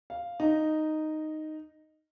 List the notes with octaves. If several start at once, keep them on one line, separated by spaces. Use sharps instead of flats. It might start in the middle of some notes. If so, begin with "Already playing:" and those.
F5
D#4